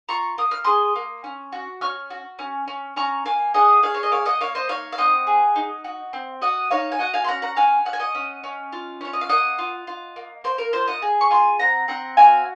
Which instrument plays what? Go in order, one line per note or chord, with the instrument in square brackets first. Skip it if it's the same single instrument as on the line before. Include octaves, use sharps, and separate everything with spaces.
[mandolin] F4 A#5 C#6
A#3 D#6
F6
G#4 C6 D#6
A#3
C#4
F#4
C#4 C#6 F6
F#4
C#4
C#4
C#4 A#5 C#6
A#3 F5 G#5
G#4 D#5 F#5
G#4 C#5 F5
C#5
D#5
A#3 C#5 F5
D#5 F#5
A#3 C#5 F5
C5 D#5
D#4 C#5 F5
F5
C4 D#5 F#5
G#4
D#4
F#4
C4
F#4 D#5 F#5
D#4 C#5 F5
G#5
F#4 D#5 F#5
F5 G#5
C6
C#4 F#5 A#5
F#5 A#5
F#4 F5 G#5
C#4 F#5
G#5
D#5 F#5
C#4
C#4
F4
C#4 C#5
D#5
F5
A#3 D#5 F#5
F4
F4
A#3
A#3 C5
A#4
F4 C5
D#5 F#5
G#4
C#6
F4 G#5 C6
C4 F#5 A#5
C4 F#5 A#5
F#4 F5 G#5